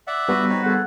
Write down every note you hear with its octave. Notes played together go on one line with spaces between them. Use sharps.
D5 E5 F#5
G3 B3 F#4 B4
C4 D#4 C#5
D#2 G#4 A4 C5 F#5